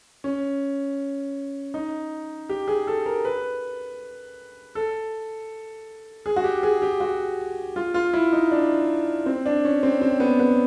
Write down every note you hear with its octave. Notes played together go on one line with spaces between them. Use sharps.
C#4
D#4
G4
G#4
A4
A#4
B4
A4
G#4
F#4
G4
G#4
G4
F#4
F4
F4
E4
D#4
D4
C4
D4
C#4
C4
C4
B3
B3